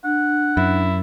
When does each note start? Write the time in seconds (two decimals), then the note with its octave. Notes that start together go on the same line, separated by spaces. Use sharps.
0.04 D4 F#5
0.57 F#2 E4